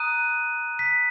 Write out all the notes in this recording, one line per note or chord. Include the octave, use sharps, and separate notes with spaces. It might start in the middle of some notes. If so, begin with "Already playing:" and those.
Already playing: A#5 D#6 F#6 D#7
B6